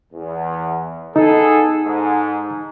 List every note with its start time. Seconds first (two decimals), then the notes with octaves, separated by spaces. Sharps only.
0.13 E2
1.16 B3 D#4 G#4 A4
1.85 G#2